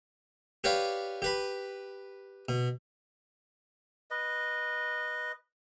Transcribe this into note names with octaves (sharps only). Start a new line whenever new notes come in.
G4 B4 C#5 D5 F5 G5
G4 B4 B5
B2
B4 D#5